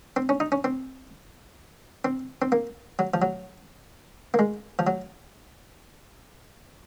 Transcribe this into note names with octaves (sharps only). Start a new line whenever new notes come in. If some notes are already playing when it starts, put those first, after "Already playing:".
C4
C#4
D#4
C#4
C4
C4
C4
A#3
F#3
F3
F#3
A#3
G#3
F3
F#3